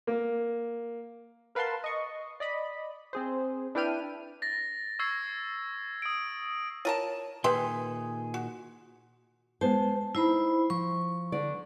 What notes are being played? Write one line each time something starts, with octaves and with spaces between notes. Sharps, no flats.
A#3
A#4 B4 F5 F#5 A5 C6
D#5 C#6
D5 D#5 B5
C4 G#4 C5
D4 E4 B4 G5 F6 D#7
A6 A#6
C#6 E6 G#6 A#6 C7
D#6 D7
F4 A#4 C#5 A5
A#2 D#3 G4 G#4 B4 E5 C6
F#4
G#3 B3 C5 A5
D#4 E4 C5 B5
F3 C#6
D3 D5